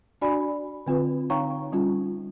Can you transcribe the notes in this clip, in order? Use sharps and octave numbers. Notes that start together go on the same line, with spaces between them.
D4 F#4 D5 G#5 B5
D3 C4 F4 B4
D#4 C#5 F5 G5 A#5 C#6
G3 C#4 D#4 F4